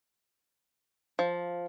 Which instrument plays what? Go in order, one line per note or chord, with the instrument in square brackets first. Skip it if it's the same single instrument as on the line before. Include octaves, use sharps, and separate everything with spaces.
[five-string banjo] F3